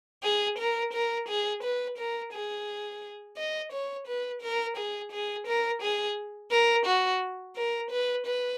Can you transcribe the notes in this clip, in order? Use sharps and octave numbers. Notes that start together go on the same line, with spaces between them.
G#4
A#4
A#4
G#4
B4
A#4
G#4
D#5
C#5
B4
A#4
G#4
G#4
A#4
G#4
A#4
F#4
A#4
B4
B4